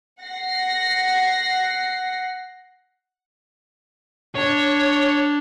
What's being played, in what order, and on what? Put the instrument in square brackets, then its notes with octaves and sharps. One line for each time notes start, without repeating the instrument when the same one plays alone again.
[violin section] F#5 A#6 C7
[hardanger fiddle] D4 [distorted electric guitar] C#5